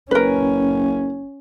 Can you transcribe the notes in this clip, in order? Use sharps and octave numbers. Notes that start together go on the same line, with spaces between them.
F#1 C#4 A#4 B4